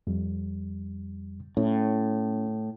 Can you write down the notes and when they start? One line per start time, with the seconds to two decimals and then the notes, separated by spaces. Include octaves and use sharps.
0.07 F2 G3
1.57 A2 C#4